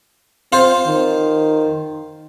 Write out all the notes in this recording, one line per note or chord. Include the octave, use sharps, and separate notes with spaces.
C4 F4 C5
D#3